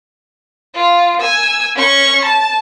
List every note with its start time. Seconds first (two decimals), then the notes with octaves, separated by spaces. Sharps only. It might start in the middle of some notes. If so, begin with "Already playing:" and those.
0.75 F4
1.21 G#5 E6
1.75 C#4 C#6
2.25 A5